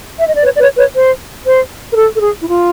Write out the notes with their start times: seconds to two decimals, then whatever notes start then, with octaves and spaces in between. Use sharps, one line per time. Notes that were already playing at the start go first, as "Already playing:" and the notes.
0.19 E5
0.26 D#5
0.35 D5
0.43 B4 C#5
0.55 D5
0.60 B4 C#5
0.77 B4 C#5
0.94 C5
1.45 C5
1.92 A#4
1.96 A4
2.14 A4
2.21 G#4
2.41 E4
2.47 F4